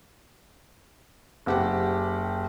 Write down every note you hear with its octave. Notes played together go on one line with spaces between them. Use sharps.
F#1 G4 F#5